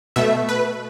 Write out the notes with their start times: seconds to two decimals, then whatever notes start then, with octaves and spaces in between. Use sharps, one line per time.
0.16 B2 A3 E5
0.49 B4